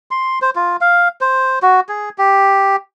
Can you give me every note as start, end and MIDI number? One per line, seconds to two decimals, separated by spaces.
0.11 0.39 84
0.42 0.50 72
0.56 0.76 65
0.81 1.08 77
1.21 1.59 72
1.62 1.80 66
1.89 2.09 68
2.18 2.76 67